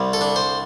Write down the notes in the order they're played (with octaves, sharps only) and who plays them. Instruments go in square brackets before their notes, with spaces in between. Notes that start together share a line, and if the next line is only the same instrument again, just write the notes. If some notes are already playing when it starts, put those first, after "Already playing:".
Already playing: [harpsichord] C2 G3
A4
D4
C5